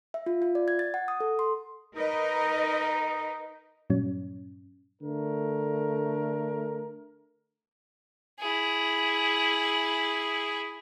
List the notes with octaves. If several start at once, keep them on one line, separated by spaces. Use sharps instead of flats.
E5
F4
F4
D5
G#6
A6
F#5
D#6
A4
C6
D#4 A#4 B4 D#5
G2 A#2 F#3 C#4
D3 A3 A#4
E4 G#4